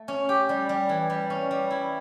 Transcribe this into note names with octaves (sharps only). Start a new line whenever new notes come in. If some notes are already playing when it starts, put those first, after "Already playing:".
Already playing: A3
C#4
G4
G3
G3
E3
G3
C#4
G3
E4